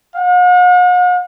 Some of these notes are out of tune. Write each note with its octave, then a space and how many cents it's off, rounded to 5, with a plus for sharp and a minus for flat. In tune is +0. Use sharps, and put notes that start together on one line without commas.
F#5 -45